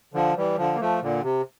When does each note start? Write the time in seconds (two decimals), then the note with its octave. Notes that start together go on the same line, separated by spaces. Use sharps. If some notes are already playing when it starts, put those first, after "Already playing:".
0.14 D3 F3
0.37 E3 G3
0.58 D3 F3
0.75 A#3
0.80 F3 A3
1.01 A#2 D3
1.23 C3